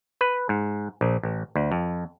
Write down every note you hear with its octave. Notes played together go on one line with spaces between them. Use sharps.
B4
G#2
A#1
A1
D2
F2